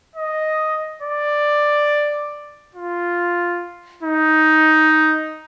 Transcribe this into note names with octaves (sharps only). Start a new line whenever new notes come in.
D#5
D5
F4
D#4